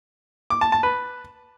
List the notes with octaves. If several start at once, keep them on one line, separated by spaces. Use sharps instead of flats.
D6
A5
A5
B4